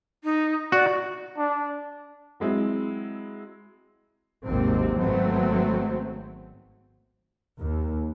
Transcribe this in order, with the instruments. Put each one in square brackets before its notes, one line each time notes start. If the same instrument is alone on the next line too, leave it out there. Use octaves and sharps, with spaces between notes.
[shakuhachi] D#4
[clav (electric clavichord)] F#4 [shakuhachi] D5
[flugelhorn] D4
[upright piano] F#3 G#3 C4 E4
[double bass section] G#1 D#2 C3 F#3 C4
G#1 F#3 A3 B3 C4
D#2